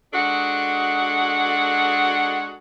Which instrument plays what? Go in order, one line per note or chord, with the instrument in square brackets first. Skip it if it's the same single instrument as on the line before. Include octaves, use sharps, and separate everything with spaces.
[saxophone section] G#3 D4 D#4 F#4 A4 F#5